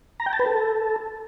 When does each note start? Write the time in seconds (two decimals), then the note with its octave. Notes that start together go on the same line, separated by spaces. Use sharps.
0.20 A#5
0.26 G5
0.33 A5
0.39 B4
0.46 A4